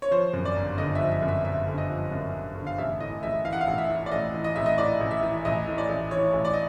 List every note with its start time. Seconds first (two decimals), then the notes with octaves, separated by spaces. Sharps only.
0.02 C#5
0.11 F3 C5
0.33 F#2
0.45 D5
0.56 G1
0.78 D3 D#5
0.95 E5
1.00 F3
1.11 E5
1.22 F#2
1.28 E5
1.44 G1 E5
1.67 D3
1.78 D#5
1.89 F3
2.12 F#2
2.34 G1
2.55 D3
2.67 F5
2.78 A1 E5
3.00 A2 D#5
3.23 A1 E5
3.45 E3 F5
3.53 F#5
3.61 F5
3.67 A1
3.78 E5
3.89 A2
4.06 D5
4.11 A1 D#5
4.34 E3
4.44 D#5
4.56 A1 E5
4.66 D#5
4.78 A2 D5
5.01 A1
5.11 E5
5.23 E3
5.45 A1 D#5
5.67 A2
5.78 D5
5.89 A1
6.11 E3 C#5
6.33 A1
6.45 D5
6.53 D#5